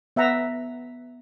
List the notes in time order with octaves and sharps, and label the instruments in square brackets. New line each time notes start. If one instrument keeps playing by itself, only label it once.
[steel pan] B3 E5 F#5 A#5